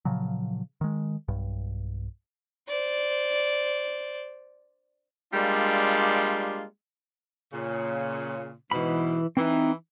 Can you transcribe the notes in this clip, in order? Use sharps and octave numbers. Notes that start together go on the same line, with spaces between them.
A#2 C#3 F3 F#3
D#3 G#3
B1 G2
C5 D5
G3 G#3 A#3 D4 F4
A#2 C#3
G#2 B2 E3 B5
E3 C4 D#4